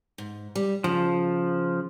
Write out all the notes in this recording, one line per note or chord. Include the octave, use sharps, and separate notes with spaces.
G#2
G3
C#3 F3